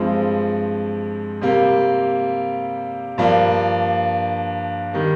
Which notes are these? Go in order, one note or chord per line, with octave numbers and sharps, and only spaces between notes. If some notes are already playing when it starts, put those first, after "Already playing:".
Already playing: G2 F3 G#3 C4
C3 G3 A#3
G2 F3 A#3 D4
D#3 G3